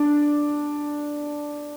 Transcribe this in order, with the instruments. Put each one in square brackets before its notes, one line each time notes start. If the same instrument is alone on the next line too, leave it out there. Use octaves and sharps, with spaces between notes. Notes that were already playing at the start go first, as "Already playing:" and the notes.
Already playing: [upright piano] D4